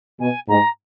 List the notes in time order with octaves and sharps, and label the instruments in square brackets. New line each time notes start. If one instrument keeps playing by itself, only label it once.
[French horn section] B2 [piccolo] G#5
[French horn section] G#2 [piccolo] A#5